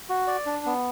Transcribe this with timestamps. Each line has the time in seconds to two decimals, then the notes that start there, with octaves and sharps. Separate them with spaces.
0.09 F#4
0.27 D5
0.46 D4
0.66 B3